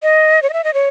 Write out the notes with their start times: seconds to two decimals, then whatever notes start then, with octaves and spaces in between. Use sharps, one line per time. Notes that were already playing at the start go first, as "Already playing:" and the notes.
0.03 D#5
0.42 C#5
0.50 D#5
0.53 E5
0.64 D#5
0.74 C#5